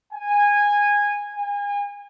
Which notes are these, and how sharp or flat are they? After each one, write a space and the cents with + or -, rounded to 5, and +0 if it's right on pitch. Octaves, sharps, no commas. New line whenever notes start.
G#5 -15
G#5 -35